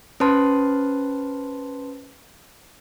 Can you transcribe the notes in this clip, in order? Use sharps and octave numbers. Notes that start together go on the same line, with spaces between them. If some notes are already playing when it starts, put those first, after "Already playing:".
C#4 B4 C5 A5 C6